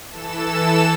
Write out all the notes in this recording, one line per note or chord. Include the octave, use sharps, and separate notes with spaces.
E3 A4 E6 E7